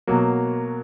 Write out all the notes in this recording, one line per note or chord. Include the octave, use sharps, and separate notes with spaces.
B2 F#3 A#3